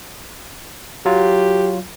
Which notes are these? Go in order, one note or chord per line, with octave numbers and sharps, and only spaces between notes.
F#3 F4 G4